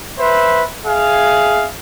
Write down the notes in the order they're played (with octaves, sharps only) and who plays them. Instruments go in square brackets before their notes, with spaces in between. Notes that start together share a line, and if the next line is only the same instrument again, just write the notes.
[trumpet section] B4 C5 E5
G#4 E5 F5